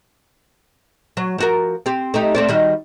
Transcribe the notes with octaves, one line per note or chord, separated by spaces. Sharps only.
F#3
F3 F#4 A#4
C4 G4
A3 D#4 G4
A3 C4 D5
D#3 G3 F#4